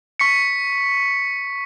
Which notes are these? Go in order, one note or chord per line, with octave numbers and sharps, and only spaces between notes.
C#6 B6 C#7